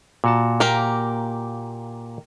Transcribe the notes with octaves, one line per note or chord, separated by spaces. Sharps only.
A#2 F#4 A5
A#3 G4 A#4